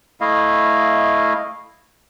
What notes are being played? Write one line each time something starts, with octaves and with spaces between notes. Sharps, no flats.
A3 E4 D#5 F5